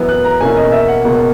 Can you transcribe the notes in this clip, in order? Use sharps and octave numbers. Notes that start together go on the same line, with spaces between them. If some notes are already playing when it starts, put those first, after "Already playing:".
Already playing: F#2 E3 B3
F#6
A#5
E2 B2 A#3 C#4 E4 G#5
D#5
E5
F#5
C#2 B2 A#3 C#4